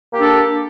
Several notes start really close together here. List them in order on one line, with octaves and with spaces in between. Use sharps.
A#3 G4 D4 A4